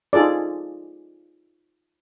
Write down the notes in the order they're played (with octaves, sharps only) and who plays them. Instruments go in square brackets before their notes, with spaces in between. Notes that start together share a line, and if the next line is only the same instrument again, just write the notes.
[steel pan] D#4 F4 G#4 A4 D5